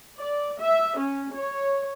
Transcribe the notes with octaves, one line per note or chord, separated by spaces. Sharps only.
D5
E5
C#4
C#5